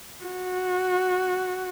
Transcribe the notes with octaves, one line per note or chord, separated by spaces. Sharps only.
F#4